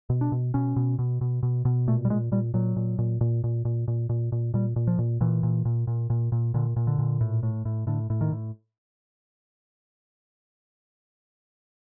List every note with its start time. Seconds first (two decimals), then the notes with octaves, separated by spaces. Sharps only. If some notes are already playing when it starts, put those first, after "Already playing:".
0.10 B2
0.21 D4
0.32 B2
0.54 B2 C#4
0.76 B2
0.99 B2
1.21 B2
1.43 B2
1.65 B2
1.87 A#2 A3
2.05 G3
2.10 A#2 G#3
2.32 A#2 G3
2.54 A#2 F#3
2.76 A#2
2.99 A#2
3.21 A#2
3.44 A#2
3.65 A#2
3.88 A#2
4.09 A#2
4.32 A#2
4.54 A#2 G3
4.76 A#2
4.87 F3
4.99 A#2
5.21 A#2 E3
5.43 A#2
5.65 A#2
5.87 A#2
6.10 A#2
6.32 A#2
6.54 A#2 D3
6.76 A#2
6.87 D3
6.99 A#2
7.21 A2
7.43 A2
7.65 A2
7.87 A2 D3
8.10 A2
8.21 D#3
8.32 A2